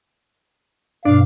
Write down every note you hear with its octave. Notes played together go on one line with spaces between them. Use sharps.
G2 B2 D4 F5